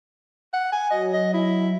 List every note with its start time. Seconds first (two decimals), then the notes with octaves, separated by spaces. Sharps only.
0.54 F#5
0.73 G#5
0.91 F#3 D#5
1.13 D#5
1.34 E4